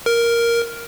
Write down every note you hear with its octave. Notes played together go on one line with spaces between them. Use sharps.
A#4